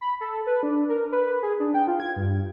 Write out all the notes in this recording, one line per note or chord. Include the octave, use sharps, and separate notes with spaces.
B5
A4
B4
D4
A#4
B4
G#4
D4
G5
F4
G#6
G2